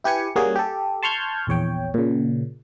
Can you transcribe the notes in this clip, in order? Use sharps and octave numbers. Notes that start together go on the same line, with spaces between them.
E4 G4 B4 G#5 C#7
G3 A#3 C#4 F#4 G#4
G4 A4
A5 C6 C#6 F6 G6 G#6
A#1 E2 C#5 G5
A#2 C#3